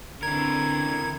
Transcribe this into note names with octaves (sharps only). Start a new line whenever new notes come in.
D3 E3 C4 A#4 G#6